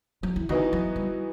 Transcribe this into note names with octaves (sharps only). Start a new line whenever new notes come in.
F#3
E3
D#3 E3 B3 D#4 F#4
F#3
G3